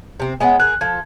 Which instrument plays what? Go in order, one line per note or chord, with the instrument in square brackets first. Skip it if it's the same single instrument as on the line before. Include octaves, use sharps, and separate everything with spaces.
[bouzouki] C3 C4
[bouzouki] G#3 B3 C#4 [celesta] F#5 G#5
[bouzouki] G#4 A#4 [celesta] F#6
[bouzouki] F3 A4 [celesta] G#6